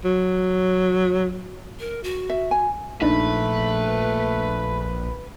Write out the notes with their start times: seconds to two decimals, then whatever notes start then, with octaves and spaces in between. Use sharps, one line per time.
0.05 F#3
1.80 A#4
2.04 F#4
2.29 E5
2.51 G#5
3.02 A#1 A3 D4 D#4 B4